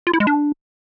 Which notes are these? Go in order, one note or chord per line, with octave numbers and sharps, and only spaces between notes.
F4
E4
G#3
D4